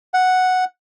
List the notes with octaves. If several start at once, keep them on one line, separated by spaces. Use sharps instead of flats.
F#5